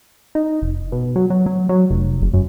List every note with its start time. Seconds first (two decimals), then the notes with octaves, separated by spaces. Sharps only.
0.35 D#4
0.62 F1
0.92 B2
1.16 F#3
1.30 F#3
1.46 F#3
1.69 F#3
1.90 F1
2.22 F#1
2.33 F#2